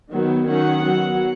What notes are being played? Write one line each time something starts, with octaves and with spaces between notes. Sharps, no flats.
D#3 F#3 B3
D#3 F#3 C#4 F#5
F#3 B3